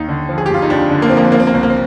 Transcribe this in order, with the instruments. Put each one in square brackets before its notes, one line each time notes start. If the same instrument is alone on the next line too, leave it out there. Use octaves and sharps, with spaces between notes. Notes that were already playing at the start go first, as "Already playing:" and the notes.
Already playing: [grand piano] D#2 D#4
D3
F3
G#4
G4
G1 F4
D#4
F2 D4
D3
A#3
C4
F3 A#3
C4
F3 A#3
C4
A#3
C2 C4
A#3
C4